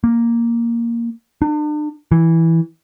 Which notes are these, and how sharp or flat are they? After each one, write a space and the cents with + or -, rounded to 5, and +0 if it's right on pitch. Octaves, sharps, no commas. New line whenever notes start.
A#3 +0
D4 +40
E3 -5